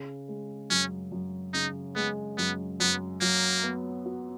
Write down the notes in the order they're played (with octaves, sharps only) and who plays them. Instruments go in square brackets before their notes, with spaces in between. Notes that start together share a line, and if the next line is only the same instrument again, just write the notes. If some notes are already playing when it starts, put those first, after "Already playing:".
Already playing: [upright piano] C#3
G#3
[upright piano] F#2 [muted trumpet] C#4
[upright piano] F#2
[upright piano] C#3 [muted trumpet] D#4
[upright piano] G#3 [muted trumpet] B3
[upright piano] F#2 [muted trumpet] B3
[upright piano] F#2 [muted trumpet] B3
[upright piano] F#3 [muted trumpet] A#3
[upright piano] B3
F#4